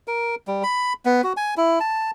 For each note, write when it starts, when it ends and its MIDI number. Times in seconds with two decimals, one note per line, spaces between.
0.08 0.35 70
0.47 0.63 55
0.63 0.93 83
1.05 1.22 59
1.24 1.33 66
1.37 1.54 80
1.57 1.79 64
1.80 2.11 81